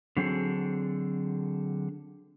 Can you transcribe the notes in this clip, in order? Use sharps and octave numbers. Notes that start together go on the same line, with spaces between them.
D3 F#3 C4 G#4 A4